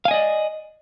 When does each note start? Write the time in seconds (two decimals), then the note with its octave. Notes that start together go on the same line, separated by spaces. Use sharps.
0.05 F5
0.08 G#5
0.11 D#5
0.14 D5